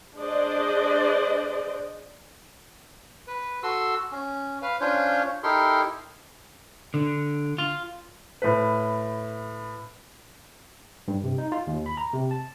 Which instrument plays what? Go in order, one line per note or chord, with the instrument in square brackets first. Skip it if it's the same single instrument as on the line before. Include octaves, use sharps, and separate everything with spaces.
[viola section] D4 G#4 C5 D5 D#5
[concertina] B4
F#4 A4 C6 E6
C#4
B4 F5
C#4 D4 F4 C5 C#5
D#4 E4 G4 A4 A#4 C6
[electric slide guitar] D3
F4
[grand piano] A2 B4
[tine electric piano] G2
C3
D#4
F4
D#2
B5
A#5
C3
A5